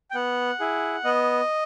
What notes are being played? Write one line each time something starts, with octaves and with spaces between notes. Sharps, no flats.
G5
B3 F#5
E4 G#4
B3 D#5